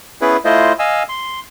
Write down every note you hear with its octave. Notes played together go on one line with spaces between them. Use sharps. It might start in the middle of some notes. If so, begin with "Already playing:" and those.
B3 C#4 E4 G#4 B4
A3 E4 F4 C5 D#5
D#5 F5 G#5 E6
C6